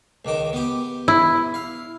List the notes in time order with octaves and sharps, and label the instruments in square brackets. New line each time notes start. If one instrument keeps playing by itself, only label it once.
[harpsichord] C#2 D#3 D6
B3 G4
[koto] E4
[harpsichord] F5